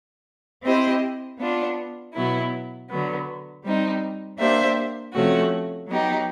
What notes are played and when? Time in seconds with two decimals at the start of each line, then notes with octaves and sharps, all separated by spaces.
0.63 C4 E4 G4 C5 D#5
1.39 B3 D4 F4
2.14 B2 F#3 B3 E4
2.89 D3 F#3 B3
3.64 G3 C4 D#4
4.38 A#3 D4 G4 C5 E5
5.14 C3 F3 A3 C#4 F#4
5.88 F#3 B3 D#4 G4